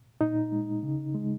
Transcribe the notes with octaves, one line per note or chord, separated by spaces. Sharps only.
A#2 D#4
G#3
C#3
G#3